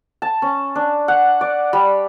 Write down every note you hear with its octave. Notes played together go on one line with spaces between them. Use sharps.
A5
C#4
D4
F#5
D5
G3